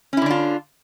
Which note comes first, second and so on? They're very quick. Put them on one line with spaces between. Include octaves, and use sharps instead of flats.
C#4 E4 D3 D4 F4